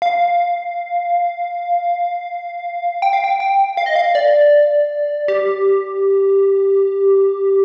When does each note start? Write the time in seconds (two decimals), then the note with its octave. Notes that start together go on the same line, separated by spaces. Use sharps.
0.02 F5
3.02 G5
3.13 F5
3.24 G5
3.40 G5
3.77 F5
3.86 D#5
3.96 F5
4.15 D5
5.28 G4